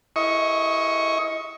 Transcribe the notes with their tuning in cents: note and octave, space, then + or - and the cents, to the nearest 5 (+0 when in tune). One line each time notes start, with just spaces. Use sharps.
E4 +0 D#5 +25 C#6 +0